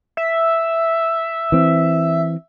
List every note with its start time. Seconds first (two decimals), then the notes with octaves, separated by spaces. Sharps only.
0.17 E5
1.52 E3 C4